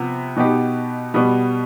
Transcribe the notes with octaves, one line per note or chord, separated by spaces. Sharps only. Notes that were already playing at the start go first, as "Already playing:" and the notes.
Already playing: C3 F3 B3
B2 B3 D#4 G4
B2 G3 B3